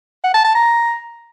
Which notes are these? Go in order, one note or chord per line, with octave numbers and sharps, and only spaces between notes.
F#5
A5
A5
A#5